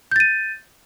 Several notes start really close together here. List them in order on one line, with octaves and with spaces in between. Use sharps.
G6 A6 D#7